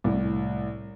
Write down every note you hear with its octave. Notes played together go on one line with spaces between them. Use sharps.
C2 A2